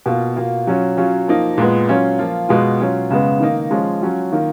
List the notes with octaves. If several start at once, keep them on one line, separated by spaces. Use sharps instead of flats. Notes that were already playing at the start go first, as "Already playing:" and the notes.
B2 A#3 F4
B2 A#3 F4
F#3 C#4 F4
F#3 C#4 F4
F3 A#3 D#4
A#2 G#3 B3
F#3 C#4 F4
F3 A#3 F4
B2 G#3 B3 F4
F#3 C#4 F4
C#3 G#3 B3
D#3 A#3 D#4
F3 G#3 C#4 F4
F#3 C#4 F4
D#3 A#3 F4